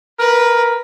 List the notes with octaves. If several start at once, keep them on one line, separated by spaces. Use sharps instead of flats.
A#4 B4